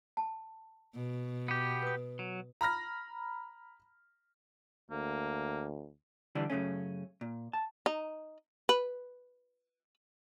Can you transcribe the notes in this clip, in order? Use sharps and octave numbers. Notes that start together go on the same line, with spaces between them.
A5
B2
B3 G4
B4 D#6
F#3
A#5 B5 F6 A#6
D2 A#3
D3 E3 G3 D4
F#2 C#3 A3 C#4
A#2
A5
D#4
B4